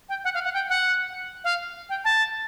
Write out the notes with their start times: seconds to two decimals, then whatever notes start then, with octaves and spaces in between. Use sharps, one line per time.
0.09 G5
0.24 F#5
0.34 F5
0.44 F#5
0.54 G5
0.69 F#5
1.44 F5
1.89 G5
2.05 A5